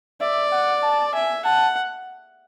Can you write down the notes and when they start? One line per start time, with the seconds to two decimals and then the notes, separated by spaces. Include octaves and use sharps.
0.21 D5 E5
0.52 F#5
0.83 A5
1.14 E5 G#5
1.45 F#5 A5